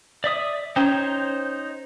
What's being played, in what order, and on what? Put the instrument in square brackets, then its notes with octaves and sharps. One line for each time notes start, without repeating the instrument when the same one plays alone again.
[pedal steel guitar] D5 E5 D#6
[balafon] C#4 G5 [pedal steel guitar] D#4 C5 C#5